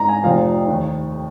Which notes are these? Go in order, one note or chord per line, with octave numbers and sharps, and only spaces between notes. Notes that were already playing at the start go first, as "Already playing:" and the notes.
Already playing: G#2 A#5
G#5
F1 F2 F3 F5
D#2 D#3